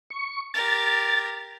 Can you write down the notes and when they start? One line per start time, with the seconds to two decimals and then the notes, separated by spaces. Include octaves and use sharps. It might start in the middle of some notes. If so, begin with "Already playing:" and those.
0.10 C#6
0.54 G4 A#4 A6